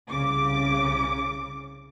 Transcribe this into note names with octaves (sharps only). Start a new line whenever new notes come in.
C2 C#3 D6